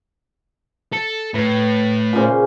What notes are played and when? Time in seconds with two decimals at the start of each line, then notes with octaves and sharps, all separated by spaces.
0.93 A4
1.34 A2 B4
2.13 A#2 C#3 C5